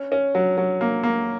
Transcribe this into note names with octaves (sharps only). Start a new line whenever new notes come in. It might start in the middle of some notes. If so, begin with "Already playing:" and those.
Already playing: C#4
C#4
F#3
F#3
A#3
A#3